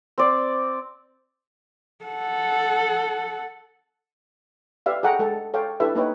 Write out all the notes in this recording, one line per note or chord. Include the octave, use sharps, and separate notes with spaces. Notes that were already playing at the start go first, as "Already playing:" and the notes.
C4 D5
A4 F#5
G4 B4 D5 E5 F5
G#4 A4 F#5 G5 A#5
G#3 A4 F#5
A4 C#5 F5 G5
D4 E4 G4 A4 B4 E5
A#3 D#4 B4 C#5 G5